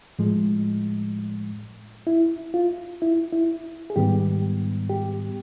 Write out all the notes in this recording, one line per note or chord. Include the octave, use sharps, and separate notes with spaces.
A2 F3 G#3
E4
F4
E4
E4
G#4
G#2 D#3 G3 B3 G4
G4